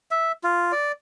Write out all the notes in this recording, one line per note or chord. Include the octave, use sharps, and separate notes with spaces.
E5
F4
D5